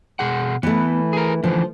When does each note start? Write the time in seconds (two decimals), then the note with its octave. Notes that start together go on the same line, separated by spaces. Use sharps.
0.19 B2 G#4 F#5
0.63 E3 A3 B3
1.13 G#4 A#4
1.44 D3 E3 F3